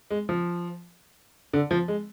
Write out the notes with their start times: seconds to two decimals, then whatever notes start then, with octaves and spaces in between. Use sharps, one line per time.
0.11 G#3
0.29 F3
1.53 D3
1.71 F3
1.88 G#3